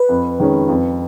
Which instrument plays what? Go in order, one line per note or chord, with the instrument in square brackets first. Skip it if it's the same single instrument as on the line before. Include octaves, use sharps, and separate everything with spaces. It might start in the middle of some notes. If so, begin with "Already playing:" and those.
Already playing: [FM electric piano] B4
[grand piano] F2
D#3 G#3 C#4
F2